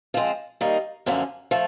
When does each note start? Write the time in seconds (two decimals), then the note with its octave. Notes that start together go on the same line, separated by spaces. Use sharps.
0.14 F3 G#3 C4
0.61 D#3 G3 A#3 D#4
1.06 F#2 D3 F3 A#3 C#4
1.51 F3 A3